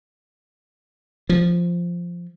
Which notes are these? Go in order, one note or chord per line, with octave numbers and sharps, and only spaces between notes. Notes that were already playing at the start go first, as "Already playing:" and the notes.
F3